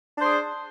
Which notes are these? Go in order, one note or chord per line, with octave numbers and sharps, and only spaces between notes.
D4 G#4 C5